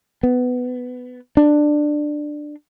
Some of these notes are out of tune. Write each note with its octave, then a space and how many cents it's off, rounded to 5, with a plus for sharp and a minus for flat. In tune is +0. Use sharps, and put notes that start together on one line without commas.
B3 +15
D4 +15